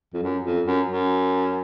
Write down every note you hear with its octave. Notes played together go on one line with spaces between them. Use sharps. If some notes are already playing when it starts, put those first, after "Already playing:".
F2
F#2
F2
F#2
F#2